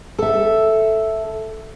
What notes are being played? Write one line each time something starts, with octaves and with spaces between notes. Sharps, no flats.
A4 E5